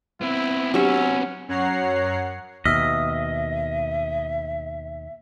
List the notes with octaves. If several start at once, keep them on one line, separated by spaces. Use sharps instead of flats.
B3 C4 E4
F#3 C#4 D4 G4 E5
F#2 C#5 F#5 A#5 C7
D#2 B2 D#5 E5 E6 F6 B6